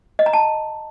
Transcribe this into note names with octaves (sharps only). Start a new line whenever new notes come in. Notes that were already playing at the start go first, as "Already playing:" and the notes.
D#5
A#5
A5